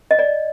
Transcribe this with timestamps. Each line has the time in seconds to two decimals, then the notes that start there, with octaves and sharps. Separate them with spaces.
0.11 D#5
0.19 D5